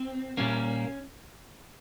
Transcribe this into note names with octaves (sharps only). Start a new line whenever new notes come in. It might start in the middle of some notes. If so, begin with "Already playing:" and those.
Already playing: C4
A#2 G3 A#3 C#4